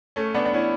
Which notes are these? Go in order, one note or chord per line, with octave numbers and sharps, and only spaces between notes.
A3 C#4
B3 D4
D4
C#4 E4